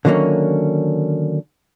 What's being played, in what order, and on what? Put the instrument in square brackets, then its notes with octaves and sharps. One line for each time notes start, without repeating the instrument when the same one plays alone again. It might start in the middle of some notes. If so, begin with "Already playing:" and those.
[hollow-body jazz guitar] D3 D#3 F#3 G3 A#3 C#4